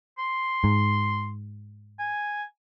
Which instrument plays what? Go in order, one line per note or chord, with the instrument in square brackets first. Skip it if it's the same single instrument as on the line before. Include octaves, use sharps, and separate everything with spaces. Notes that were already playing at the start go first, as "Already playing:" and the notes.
[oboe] C6
[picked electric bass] G#2
[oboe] G#5